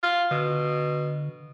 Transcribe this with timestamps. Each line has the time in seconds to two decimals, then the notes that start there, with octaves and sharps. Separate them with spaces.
0.03 F4
0.31 B2 D3